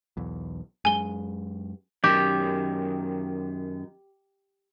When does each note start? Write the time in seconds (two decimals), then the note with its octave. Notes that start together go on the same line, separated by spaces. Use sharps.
0.17 B1 E2
0.85 F#2 G#3 G#5 G7
2.04 F#2 D#3 G4